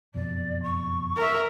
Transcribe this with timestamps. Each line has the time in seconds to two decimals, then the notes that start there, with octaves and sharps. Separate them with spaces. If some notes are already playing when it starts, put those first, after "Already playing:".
0.14 F#1 F2 B2 D5
0.63 C#6
1.17 A#4 E5